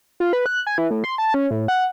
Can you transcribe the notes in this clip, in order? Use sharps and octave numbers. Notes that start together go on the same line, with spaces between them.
F4
B4
F#6
G#5
E3
A2
C6
A5
C#4
A2
F#5